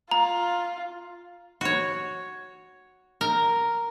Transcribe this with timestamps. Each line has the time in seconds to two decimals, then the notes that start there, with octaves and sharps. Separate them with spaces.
0.11 F4 A#5
1.61 F#4 C#5
3.21 A#4